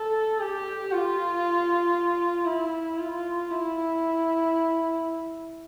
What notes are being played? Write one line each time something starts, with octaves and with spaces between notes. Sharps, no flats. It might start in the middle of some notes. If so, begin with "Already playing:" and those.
Already playing: A4
G4
F4
E4
F4
E4